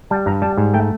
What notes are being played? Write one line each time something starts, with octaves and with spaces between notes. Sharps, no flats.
G3 A5
G2 A#5
G3 A5
G#2
A3 G5